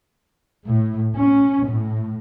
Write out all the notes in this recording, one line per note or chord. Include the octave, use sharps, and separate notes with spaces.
A2
C#4
A2